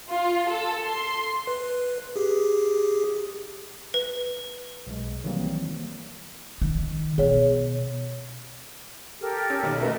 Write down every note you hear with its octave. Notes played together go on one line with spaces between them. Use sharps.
F4
A4
C6
B4
G4 G#4
B4
B1 G#3
D#3 E3 F#3 G3 A#3 C4
D#3
B2 G#4 C#5
G4 A4 A#4
C#4
B1 D#3
A3 A#4 B4 D#5 E5